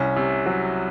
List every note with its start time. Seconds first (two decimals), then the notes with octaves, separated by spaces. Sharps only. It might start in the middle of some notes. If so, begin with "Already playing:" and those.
Already playing: C2 C#4
0.16 C3
0.46 F#3